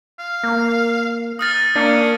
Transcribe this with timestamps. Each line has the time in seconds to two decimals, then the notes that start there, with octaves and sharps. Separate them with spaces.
0.19 F5
0.44 A#3
1.39 D#4 D#6 F6 A6
1.76 A#3 C#4 D4